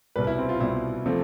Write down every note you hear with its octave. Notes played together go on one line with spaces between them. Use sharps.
C2 B2 G3 B4
E4
C4
F4
C2 B2 G3 E4
C3 F3 A3